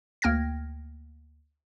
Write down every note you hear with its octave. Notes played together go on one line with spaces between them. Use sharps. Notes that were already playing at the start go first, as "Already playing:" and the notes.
D2 A#3 G5 F6 G#6 A#6